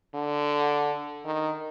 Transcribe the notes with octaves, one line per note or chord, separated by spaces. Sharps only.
D3
D#3